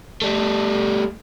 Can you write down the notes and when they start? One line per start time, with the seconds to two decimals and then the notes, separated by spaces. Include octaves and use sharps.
0.22 G3 A3